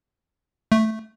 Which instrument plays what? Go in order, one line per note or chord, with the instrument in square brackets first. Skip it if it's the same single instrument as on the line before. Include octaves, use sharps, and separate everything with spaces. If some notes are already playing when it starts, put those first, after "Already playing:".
[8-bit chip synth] A3